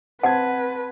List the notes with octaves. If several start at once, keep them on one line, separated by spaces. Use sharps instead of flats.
C4 B4 F#5 A5 G#6